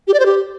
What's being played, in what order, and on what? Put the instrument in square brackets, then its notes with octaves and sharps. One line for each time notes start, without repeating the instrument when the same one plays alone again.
[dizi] G4
D5
C5
G4